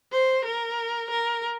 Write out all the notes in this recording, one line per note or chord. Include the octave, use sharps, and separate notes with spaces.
C5
A#4
A#4